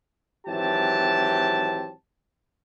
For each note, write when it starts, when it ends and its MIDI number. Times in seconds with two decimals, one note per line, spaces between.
0.47 1.92 32
0.47 1.92 52
0.47 1.92 54
0.47 1.92 60
0.47 1.92 67
0.47 1.92 81